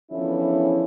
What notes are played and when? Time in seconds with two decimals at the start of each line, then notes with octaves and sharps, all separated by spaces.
0.11 E2 D3 F3 C#4 E4